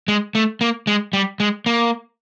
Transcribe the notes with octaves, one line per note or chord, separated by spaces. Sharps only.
G#3
A3
A#3
G#3
G3
G#3
A#3